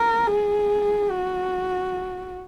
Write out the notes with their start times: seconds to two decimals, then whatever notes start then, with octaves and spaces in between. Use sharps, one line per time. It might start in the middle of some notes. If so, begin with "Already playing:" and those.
Already playing: A#4
0.28 G#4
1.10 F#4